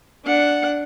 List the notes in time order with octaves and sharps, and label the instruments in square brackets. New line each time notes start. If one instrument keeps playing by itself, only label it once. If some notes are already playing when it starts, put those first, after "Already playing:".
[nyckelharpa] D4 F#5